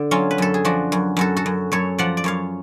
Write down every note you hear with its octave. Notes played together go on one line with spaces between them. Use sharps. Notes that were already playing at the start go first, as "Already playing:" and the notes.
Already playing: D3
F#3 C#4 F4
B4
F#2 A4
G#4
F3 D4 F#4
F#2
F#2 F#4 A4
F#4 A4
F#2
F#2 A4 C#5
F3 D5 F#5
D5
F#2 C#5 F5